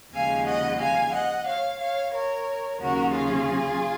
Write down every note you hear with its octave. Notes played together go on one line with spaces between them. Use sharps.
D#2 C#3 F3 G#3 F5 G#5
D#5 F#5
F5 G#5
D#5 F#5
C#5 F5
C#5 F5
A#4 C#5
D#2 C#3 F#3 C#4 F#4 A#4
F4 G#4